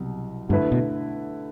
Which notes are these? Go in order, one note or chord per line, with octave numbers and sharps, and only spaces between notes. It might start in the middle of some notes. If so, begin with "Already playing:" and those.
Already playing: C2 B2 F#3
G2 D3 A3 E4 B4
B2